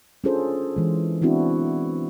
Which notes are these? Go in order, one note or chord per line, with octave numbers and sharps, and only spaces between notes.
C#4 D4 F4 G#4 A4 C5
E3 G#3
B3 C4 D4 E4 F#4